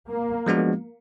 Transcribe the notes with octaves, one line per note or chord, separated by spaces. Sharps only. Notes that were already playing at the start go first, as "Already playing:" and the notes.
A#3
F3 G#3 B3 D4 F#4